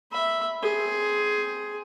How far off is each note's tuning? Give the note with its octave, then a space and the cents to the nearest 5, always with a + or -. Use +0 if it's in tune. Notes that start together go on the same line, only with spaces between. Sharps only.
E5 +0 B5 +0
C4 +0 G#4 +10